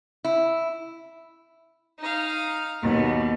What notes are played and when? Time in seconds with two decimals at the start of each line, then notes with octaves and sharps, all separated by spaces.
0.24 E4
1.99 D#4 F5
2.81 D#2 B2